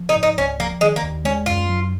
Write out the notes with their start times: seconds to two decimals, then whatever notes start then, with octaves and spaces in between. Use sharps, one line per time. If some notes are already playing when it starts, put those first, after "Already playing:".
Already playing: F3
0.09 D#4
0.16 G#2
0.23 D#4
0.37 C#2 C#4
0.59 F3 A#3
0.81 D#3 G#3
0.96 A#3
1.03 D#2
1.24 G#3 C#4
1.46 F#2 F4
1.69 F#3